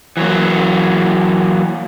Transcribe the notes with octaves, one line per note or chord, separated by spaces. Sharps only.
E3 F#3 A#3